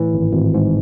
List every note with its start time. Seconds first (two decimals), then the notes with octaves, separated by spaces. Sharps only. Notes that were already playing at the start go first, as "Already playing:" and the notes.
Already playing: A2 E3
0.14 G#1
0.34 G#1
0.54 G#2